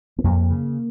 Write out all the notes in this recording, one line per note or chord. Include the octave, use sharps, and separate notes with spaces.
B3
F2 A#3
C#3